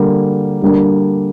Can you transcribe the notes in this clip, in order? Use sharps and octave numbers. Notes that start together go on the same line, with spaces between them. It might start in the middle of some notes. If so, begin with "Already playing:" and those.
Already playing: D3 G3 A#3
D3 G3 A#3 D4